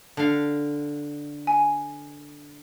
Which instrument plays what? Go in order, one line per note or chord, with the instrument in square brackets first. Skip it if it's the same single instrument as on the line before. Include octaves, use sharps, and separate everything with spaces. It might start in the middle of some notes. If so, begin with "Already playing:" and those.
[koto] D3 F5
[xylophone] G#5